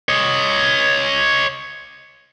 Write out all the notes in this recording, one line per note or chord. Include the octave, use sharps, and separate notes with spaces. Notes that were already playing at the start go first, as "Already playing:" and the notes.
C#5 D#5